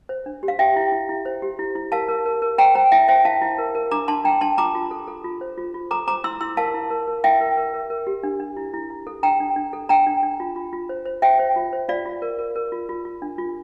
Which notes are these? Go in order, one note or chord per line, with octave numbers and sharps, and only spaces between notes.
C5
D4
G4
F5
G4 E5 G5
E4
E4
E4
C5
G4
E4
E4
A#4 F5 A5
A#4
A#4
A#4
C5 G5 A#5
C5 G5 A#5
E4 E5 G5
C5 E5 G5
E4 F5 A5
E4
A#4
A#4
D4 A#5 D6
D4 A5 C6
D4 G5 A#5
D4 A5 C6
F4 A#5 D6
F4
A4
A4
F4
C5
F4
F4
A4 A#5 D6
C5 A#5 D6
E4 C6 E6
E4 C6 E6
A#4 F5 A5
E4
A#4
A#4
E4 E5 G5
A#4
A#4
A#4
A#4
G4
D4
D4
E4
E4
E4
A4
D4 G5 A#5
D4
D4
A4
D4 G5 A#5
D4
D4
F4
F4
F4
C5
C5
C5 E5 G5
C5
F4
C5
F4 D5 F5
F4
A#4
A#4
A#4
F4
F4
F4
D4
F4